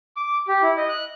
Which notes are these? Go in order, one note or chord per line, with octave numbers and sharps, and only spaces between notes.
D6
G4
E4
D#5
F#6